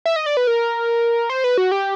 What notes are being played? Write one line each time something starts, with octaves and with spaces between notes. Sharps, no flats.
E5
D#5
D5
B4
A#4
C5
B4
F#4
G4